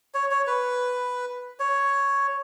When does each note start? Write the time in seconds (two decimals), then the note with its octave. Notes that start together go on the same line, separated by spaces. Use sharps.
0.14 C#5
0.31 C#5
0.47 B4
1.59 C#5